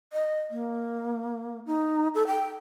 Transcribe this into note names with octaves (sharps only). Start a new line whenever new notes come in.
D#5
A#3
D#4
A4
G5